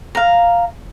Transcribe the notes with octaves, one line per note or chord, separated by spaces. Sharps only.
F5 A#5